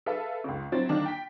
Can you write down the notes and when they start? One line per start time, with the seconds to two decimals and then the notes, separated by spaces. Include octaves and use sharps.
0.06 G#4 A4 B4 E5 F5
0.44 C#2 C#3
0.72 F#3 C4 E4 C5 A6
0.89 D3 D#3 A#3 D4
1.05 G5 B6